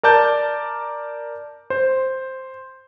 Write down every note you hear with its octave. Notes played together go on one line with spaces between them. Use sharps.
A#4 D5 A5 G6
C5